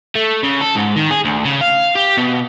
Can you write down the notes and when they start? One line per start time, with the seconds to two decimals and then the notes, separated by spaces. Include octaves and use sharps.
0.15 A3
0.43 C#3
0.62 A4
0.76 G#2
0.96 D#3
1.11 G#4
1.25 D2
1.45 C#3
1.61 F5
1.95 G4
2.17 B2